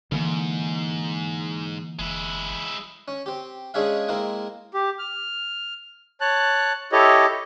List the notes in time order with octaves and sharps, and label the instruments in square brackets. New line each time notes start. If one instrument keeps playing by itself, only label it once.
[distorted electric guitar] G#2 [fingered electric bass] D3 E3 A#3
[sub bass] F1 [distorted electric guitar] G#3 E4
[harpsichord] C#4
C4 G4
G#3 C#4 D4 G#4 E5 F5
G#3 A#3 C4 E4 A#4
[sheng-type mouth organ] G4
F6
C#5 A5 F#6
E4 G4 A4 C#5 D#5